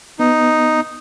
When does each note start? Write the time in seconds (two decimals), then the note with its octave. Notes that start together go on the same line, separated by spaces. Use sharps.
0.19 B3 D#4